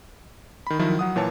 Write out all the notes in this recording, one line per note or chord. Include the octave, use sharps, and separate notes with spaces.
D#3 B5
D#3 F3 F#3 E4
F#3 F#5 D#6
A#2 E3 C#5 A5